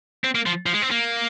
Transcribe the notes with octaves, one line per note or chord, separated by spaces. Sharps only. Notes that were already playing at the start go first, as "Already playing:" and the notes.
C4
A#3
F3
F3
G#3
C4
A#3